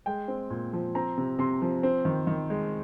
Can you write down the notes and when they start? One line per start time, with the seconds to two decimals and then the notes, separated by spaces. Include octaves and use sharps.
0.06 G#3 G5
0.28 C4
0.50 A#2
0.73 F3
0.95 C4 A#5
1.18 C3
1.39 C3 C6
1.62 F3
1.83 C4
2.05 D#3
2.27 D#3
2.50 G#3